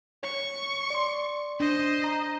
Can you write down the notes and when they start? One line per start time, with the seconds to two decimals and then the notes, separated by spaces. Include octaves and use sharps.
0.23 C#5 C#6
0.90 D5 C6
1.60 D4 C5 D#5
2.04 A#5